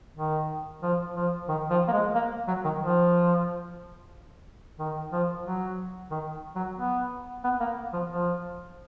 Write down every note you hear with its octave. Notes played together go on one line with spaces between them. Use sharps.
D#3
F3
F3
D#3
F3
A#3
G#3
A#3
F#3
D#3
F3
D#3
F3
F#3
D#3
F#3
B3
B3
A#3
F3
F3